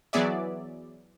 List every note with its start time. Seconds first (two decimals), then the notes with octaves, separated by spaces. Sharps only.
0.13 E3 F#3 B3 G#4 D5 E5